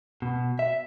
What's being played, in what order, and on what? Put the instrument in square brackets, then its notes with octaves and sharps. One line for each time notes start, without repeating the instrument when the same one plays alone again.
[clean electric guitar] B2
E5